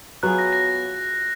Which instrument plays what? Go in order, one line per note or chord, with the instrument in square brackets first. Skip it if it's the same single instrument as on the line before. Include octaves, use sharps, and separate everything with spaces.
[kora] F#3 B3 F4 G#4 [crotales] F#6
[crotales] A#6
A#6